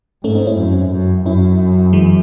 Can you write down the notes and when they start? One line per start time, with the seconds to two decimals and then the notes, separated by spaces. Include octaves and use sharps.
0.24 G#2 A3 C#4
0.35 C4 D#4
0.47 C#4 E4
0.58 F#2
0.92 F#2
1.25 F#2 C#4 E4
1.93 E3 G#3